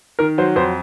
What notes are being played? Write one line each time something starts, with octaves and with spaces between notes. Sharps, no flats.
D#3 A#4
F#3 C5
F2 C5